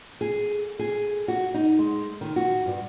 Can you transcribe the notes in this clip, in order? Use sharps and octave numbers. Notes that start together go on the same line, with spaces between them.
G#4
G#4
F#4
D#4
G#3
D#3
F#4
G2